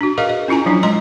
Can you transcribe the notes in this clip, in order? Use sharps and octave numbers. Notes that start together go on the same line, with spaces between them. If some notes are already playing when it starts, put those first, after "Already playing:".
D4 F#4
G#4 A#4 B4 D#5 F5
D#5
C#4 E4 F4 G#5 A#5
F3 F#3 D4 E4
G#3 D#5 A#5 C6